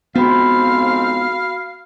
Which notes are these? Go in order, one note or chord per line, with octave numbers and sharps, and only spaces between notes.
F2 G#2 B3 C4 F#4 F5 B5